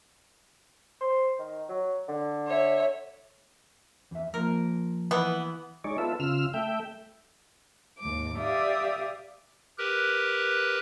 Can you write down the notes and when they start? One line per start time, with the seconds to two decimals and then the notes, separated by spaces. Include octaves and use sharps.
1.01 C5
1.39 D#3
1.68 F#3
2.08 D3
2.47 C#5 E5
4.11 E2 E5
4.34 F3 A#3 A#4
5.11 E3 B3
5.84 G#3 D#4 C#5 D5
5.98 B3 F4 A4 E5
6.20 C#3 F4 E6 F6
6.54 A3 E5 G5
7.99 D#2 G#2 D6
8.36 G4 D5 E5 F5 D#6
9.78 G4 A#4 B4 F#6